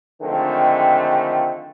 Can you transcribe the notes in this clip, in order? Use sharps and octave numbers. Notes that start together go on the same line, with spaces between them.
D3 D#3 F3 G#3 A3 C4